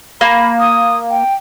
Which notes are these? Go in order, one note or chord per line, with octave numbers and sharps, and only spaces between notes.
A#3 B5
D#6
G5